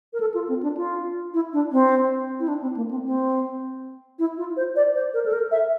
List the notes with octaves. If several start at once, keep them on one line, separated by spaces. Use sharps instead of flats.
A#4
A4
F4
C4
D4
F4
E4
D4
C4
E4
D4
C4
A#3
C4
C4
E4
F4
C5
D5
C5
A#4
A4
A#4
E5